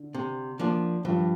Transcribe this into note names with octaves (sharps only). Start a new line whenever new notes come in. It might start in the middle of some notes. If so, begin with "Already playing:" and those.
Already playing: D3
C3
F3 A#3 D4
G2 F3